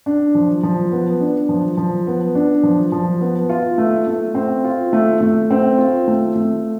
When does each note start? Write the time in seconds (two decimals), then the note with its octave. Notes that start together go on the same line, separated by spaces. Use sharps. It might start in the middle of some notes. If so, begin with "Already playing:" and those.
0.06 D4
0.35 F3
0.63 F3
0.92 B3
1.20 D4
1.49 F3
1.77 F3
2.07 B3
2.35 D4
2.63 F3
2.92 F3
3.21 B3
3.50 F4
3.78 A3
4.07 A3
4.35 C4
4.64 F4
4.93 A3
5.21 A3
5.51 C4
5.78 F4
6.08 A3
6.36 A3